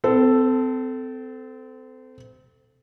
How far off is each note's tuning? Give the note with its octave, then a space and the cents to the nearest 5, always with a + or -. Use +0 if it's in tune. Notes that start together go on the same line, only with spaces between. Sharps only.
C4 -30 A4 +0